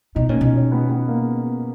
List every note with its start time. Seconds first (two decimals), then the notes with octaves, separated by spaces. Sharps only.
0.15 B2 D#4
0.29 A#2 C#4
0.41 B2 D#4
0.58 C#4
0.72 B3
0.89 B3
1.08 A#3